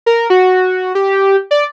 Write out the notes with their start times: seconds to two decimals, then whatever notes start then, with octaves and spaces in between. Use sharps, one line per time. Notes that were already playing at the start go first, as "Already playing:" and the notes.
0.06 A#4
0.30 F#4
0.95 G4
1.51 D5